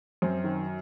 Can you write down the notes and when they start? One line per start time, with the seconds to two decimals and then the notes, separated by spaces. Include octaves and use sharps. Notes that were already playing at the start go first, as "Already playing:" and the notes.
0.22 F#2 C4
0.44 D#3